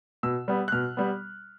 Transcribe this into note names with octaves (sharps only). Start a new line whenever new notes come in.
B2 E6
G3 B3
F#6
B2 F6
G3 B3